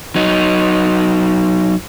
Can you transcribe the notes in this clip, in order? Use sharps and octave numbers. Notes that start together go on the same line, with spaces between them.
F#3 D#4